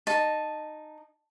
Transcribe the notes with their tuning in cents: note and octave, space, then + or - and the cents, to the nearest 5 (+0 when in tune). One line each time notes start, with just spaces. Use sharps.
D#4 -15 A5 +0